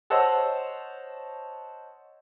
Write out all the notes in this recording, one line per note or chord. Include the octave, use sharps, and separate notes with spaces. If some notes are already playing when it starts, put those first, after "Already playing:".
C5 C#5 D#5 F#5 A5 E6